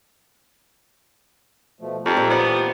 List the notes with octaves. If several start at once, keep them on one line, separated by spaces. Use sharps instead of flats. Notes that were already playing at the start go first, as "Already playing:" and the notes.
B2 F3 A3
F2 C4 D#4 F4 G4 C5 A#5
A#2
B3 C5 D5
E3 G5